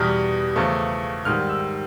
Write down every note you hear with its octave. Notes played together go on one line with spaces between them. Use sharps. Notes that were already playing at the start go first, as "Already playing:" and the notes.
Already playing: E2 B2 G3 F6
E2 C#3 F3 A3
G#2 D#3 G3 F6
E6